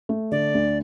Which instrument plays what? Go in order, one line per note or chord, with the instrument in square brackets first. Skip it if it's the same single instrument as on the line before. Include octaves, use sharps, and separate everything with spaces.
[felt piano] A3
[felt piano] D3 [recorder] D5
[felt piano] D2